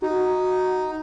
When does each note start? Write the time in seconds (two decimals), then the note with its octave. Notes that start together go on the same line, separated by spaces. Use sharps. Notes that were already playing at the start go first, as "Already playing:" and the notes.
0.02 D#4 F#4